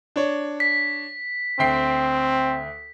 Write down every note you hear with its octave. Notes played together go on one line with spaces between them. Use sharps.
D4 C#5
B6
D2 C4 G5 C7